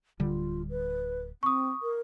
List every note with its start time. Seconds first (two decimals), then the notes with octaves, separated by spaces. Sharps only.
0.20 D1 D3 G3 F4
0.70 B4
1.43 C4 C#6 D#6
1.83 A#4